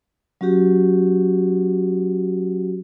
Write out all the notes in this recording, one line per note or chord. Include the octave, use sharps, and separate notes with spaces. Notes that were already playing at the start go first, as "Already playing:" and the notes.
F#3 C#4 F#4 G4